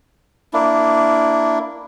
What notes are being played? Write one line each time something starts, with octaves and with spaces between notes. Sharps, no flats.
A#3 D4 E4